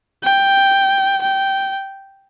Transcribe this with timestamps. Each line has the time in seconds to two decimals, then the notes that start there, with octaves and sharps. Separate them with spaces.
0.23 G5
1.22 G5